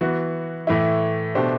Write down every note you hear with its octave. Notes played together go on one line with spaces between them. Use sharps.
E3 B3 F#4
A2 E3 A3 E4
B2 A3 D4 G4 C5